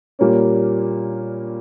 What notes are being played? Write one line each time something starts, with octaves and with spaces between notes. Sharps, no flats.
A#2 G3 A#3 C#4